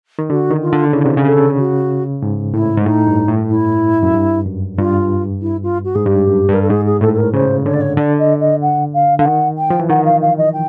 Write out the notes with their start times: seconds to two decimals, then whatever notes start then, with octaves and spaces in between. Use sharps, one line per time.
0.19 D#3
0.30 D3 F#4
0.51 D#3
0.62 F4
0.73 D3
0.93 C#3 E4
1.06 C3
1.17 C#3
1.26 A4
1.58 F#4
2.22 G#2
2.54 A2 E4
2.77 G#2
2.86 A2 D#4
3.07 G2
3.28 A2
3.50 E4
4.03 F#2
4.14 G2
4.46 F#2
4.78 G2 F4
5.41 E4
5.63 F4
5.84 F#4
5.95 G#2 G#4
6.05 G2 G4
6.27 F#2
6.49 G2 A#4
6.62 A4
6.70 G#2 G#4
6.85 G#4
7.01 A2 A4
7.13 A4
7.17 A#4
7.34 C#3 C5
7.65 D3 C#5
7.73 D5
7.81 C#5
7.97 D3 D5
8.19 D#5
8.40 D#5
8.61 F#5
8.93 F5
9.18 D3 F5
9.25 D#3 F#5
9.58 G5
9.70 F3
9.80 E3
9.89 D#3 F#5
10.05 F5
10.22 F5
10.38 D#5
10.53 G5